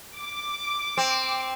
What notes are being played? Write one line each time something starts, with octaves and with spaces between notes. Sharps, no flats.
D6
C4